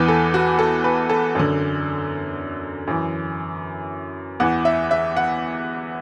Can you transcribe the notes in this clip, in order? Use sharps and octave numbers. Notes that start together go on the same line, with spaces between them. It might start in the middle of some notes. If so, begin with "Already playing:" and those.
Already playing: E2 E3 B4
A4
F#4
A4
B4
A4
F#2 D3
F#2 E3
E2 E3 F#5
E5
E5
F#5